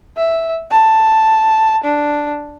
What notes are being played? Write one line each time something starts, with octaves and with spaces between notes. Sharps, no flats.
E5
A5
D4